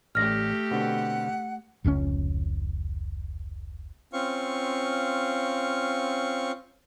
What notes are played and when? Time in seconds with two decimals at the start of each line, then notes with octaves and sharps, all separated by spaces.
0.15 A1 A3 G4 D5 F6 A#6
0.71 B2 D3 C4 F#5
1.84 F1 C#2 B2 C#4
4.13 C4 C#4 F4 F5 C#6